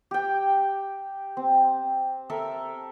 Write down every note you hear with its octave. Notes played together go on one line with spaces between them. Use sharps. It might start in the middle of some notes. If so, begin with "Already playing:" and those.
G4 G5
C4
A4 A#4 E5 A5